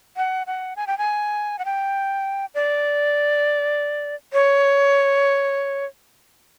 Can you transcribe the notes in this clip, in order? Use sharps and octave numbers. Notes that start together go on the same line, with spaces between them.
F#5
F#5
G#5
G5
G#5
F#5
G5
D5
C#5